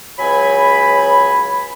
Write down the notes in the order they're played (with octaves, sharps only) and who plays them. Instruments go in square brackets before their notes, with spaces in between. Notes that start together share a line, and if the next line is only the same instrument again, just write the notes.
[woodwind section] C#2 F#3 G#5 B5